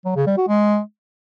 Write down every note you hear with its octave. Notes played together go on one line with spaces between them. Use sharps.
F#3
C#3
G3
F#4
G#3